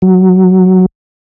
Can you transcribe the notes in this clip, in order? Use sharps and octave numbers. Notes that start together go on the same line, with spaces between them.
F#3